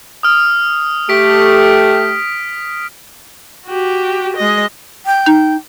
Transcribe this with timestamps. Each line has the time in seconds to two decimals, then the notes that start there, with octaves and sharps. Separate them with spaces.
0.23 D#6 F6
1.09 A3 G4 B6 D7
3.66 F#4 G4
4.36 G#3 D#5
5.06 G5
5.26 D#4